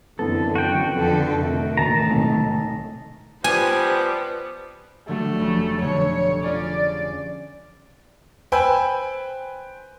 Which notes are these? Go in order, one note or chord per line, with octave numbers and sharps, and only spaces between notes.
F#2 D3 E3 B3 C4 A4
F#4 G5
F2 D3 A4
A2 C3 D#3 E5
E1 D2 A5 A#5
B1 G#2 C3
F3 G3 B3 G4 C5 G#5
D3 F#3 G3 A3
F1
F1 B2 D3 C#5
C#4 F4 G#4 D5
B4 C5 G5 G#5 B5 E6